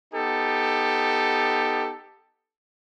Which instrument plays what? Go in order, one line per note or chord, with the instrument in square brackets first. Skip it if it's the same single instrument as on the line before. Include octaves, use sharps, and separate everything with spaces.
[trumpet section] B3 D#4 G4 A4